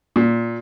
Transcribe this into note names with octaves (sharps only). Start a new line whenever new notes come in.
A#2